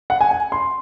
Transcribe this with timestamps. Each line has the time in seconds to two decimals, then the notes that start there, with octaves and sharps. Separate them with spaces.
0.10 F#5
0.21 G#5
0.31 G#5
0.52 C6